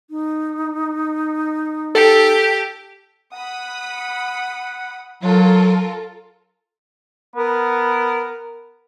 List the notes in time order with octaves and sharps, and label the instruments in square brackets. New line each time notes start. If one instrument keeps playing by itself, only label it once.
[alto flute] D#4
[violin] G4 [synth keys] A4
[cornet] F#5 [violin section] B5 D#6
[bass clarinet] F#3 [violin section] F4 A4 A#4
[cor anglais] B3 [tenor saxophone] A#4